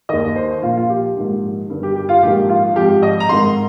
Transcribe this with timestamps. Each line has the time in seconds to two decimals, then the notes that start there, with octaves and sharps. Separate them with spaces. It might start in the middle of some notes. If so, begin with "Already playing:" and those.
0.09 D#2 D#3 D#5
0.36 C5
0.62 A#1 A#2 F3 F4
0.77 F4
0.89 G4
1.16 A#1 G#2 D#3
1.69 G1 G2 D#3
1.83 G4
1.95 G4
2.09 F4
2.23 A#1 G#2 D#3 G4
2.49 F4
2.76 G#1 G#2 F3 G4
3.03 D#5
3.20 A#5
3.29 G#1 G#2 D#3 C6